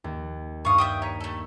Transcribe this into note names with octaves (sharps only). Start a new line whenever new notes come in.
D#2
G2 F5 C#6 D#6
E5 G5 D#6
C#5 A#5 B6 D#7
A3 A4